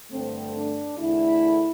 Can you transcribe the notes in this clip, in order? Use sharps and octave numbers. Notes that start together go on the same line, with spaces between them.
G2 D3 A3 C4
D4
E2 D3 A3 E4